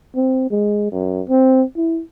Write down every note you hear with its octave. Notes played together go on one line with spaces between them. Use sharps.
C4
G#3
F#2
C4
E4